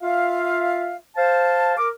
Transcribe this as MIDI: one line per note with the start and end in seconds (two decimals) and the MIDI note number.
0.02 0.95 65
0.02 0.95 76
0.02 0.95 77
1.17 1.73 72
1.17 1.73 77
1.17 1.73 81
1.78 1.88 70
1.78 1.88 86